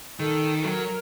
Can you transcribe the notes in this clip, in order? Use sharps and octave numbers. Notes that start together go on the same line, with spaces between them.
D#3 A4
F#3 A#4